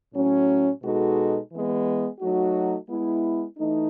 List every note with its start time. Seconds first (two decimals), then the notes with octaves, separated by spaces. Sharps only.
0.14 A2 F#3 C#4
0.83 B2 G#3 D#4 F#4 A4
1.51 E3 G#3 B3
2.20 F#3 A3 D#4 F#4
2.89 G#3 B3 E4
3.58 E3 A3 D#4